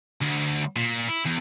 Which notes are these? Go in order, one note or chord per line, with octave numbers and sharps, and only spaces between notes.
D2
A#2
E4
E2